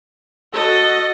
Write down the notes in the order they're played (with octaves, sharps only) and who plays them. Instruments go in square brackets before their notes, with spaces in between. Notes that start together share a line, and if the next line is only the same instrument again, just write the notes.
[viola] F#4 D#5 [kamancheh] A4